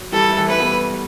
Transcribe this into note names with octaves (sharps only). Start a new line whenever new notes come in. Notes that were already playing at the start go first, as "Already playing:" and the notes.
Already playing: F#3
E3 G3 A4
A3
E3 G3
A3 B4
G3 B3